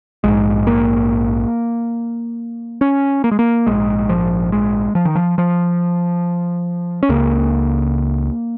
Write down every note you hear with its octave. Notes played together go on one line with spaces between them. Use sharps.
A#1 G#2 G#3
A#3
C#4
A#3
G#3
A#3
A#1 G#2 G#3
F3
G#3
F3
D#3
F3
F3
C#4
C#2 C#3 A#3